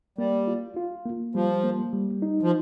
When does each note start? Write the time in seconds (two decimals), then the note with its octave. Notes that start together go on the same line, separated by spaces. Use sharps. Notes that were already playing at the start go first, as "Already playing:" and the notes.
0.18 G3 A#3
0.48 F4
0.77 F4
1.06 A#3
1.35 F3 G3
1.64 A#3
1.93 G3
2.22 D#4
2.43 F3